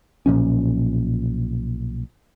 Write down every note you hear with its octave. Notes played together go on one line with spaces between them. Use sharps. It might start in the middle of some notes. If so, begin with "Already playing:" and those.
B1 A#2 F3 C#4